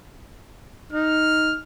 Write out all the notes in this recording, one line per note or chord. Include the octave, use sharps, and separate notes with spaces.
D#4 F6